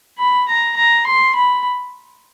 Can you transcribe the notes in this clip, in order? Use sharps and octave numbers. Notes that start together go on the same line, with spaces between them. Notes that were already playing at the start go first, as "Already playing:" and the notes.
B5
A#5
A#5
C6
B5